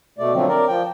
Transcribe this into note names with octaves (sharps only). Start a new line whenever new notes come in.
B2 A3 D5
D3 F3 F#3 A3 C4
A#4 D5
F3 G5